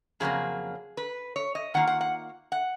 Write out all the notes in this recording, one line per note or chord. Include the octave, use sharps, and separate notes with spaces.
F2 C#3 F#3 A#3 G#4
B4
C#5
D#5
D#3 A#3 F4 F#5
F#5
F#5
F#5